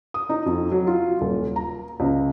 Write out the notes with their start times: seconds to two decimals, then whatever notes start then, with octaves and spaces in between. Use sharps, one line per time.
0.14 D#6
0.29 D#4
0.46 F2
0.71 F#3
0.87 F4
1.21 D#1
1.56 A#5
2.00 C#2